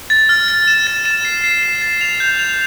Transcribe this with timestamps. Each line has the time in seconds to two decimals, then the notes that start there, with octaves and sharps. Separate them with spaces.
0.10 A6
0.29 F6
0.48 A6
0.68 E7
0.87 A6
1.05 E7
1.25 C7
1.44 C7
1.63 E7
1.82 A6
2.01 F7
2.20 G6
2.39 F7